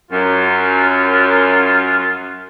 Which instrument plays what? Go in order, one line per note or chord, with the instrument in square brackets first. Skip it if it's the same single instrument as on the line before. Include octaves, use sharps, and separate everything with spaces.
[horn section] F#2 [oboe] F4